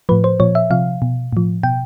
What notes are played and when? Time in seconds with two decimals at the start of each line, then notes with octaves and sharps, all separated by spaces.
0.09 A2 F3 B4
0.24 C5
0.40 A#2 F3 C#5
0.55 E5
0.70 C3 F3 F5
1.02 B2
1.33 A2 F3
1.63 B2 G5